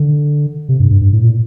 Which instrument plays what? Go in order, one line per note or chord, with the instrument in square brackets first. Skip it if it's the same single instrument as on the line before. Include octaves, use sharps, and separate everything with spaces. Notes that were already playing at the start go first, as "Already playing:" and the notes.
Already playing: [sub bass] D3
C3
G2
G2
G2
A2
A#2